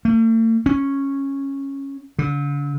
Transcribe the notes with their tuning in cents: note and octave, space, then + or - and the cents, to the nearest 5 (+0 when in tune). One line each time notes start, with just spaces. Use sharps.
A3 +45
C#4 -10
D3 -40